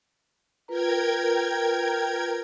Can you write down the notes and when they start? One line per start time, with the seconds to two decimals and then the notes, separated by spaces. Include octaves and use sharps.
0.68 F4 A#4 B4 G5 A#5 G#6